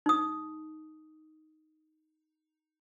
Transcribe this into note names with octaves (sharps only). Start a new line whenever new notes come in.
D#4 D#6